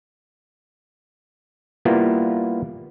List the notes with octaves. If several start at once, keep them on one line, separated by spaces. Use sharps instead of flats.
G3 A#3 B3 E4 F4